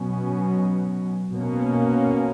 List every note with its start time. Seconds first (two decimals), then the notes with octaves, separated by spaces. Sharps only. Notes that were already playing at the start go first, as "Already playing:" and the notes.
Already playing: B2 F#3 C#4
1.33 B2 A#3 C#4